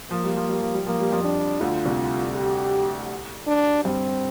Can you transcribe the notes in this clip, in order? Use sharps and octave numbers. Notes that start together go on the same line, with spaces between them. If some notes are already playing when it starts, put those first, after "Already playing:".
F3 A#3
G3
F3
G3
F3
G3
F3 A#3
G3
F2 F3
D4
D2 D3 F4
C2 C3
G4
D4
G2 C4